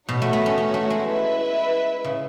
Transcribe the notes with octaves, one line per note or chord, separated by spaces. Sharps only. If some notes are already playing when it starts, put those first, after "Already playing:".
B2 D#4 F#4 A4 C#5 F#5
A3
B3
C#4
C#4
A3
G#3
E4 B4 E5
C#3